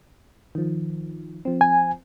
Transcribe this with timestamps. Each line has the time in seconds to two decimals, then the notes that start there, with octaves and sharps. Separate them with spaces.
0.55 D#3 F3
1.45 F3 C4
1.61 G#5